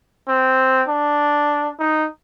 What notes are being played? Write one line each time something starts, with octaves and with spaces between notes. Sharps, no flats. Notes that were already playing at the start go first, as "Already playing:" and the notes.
C4
D4
D#4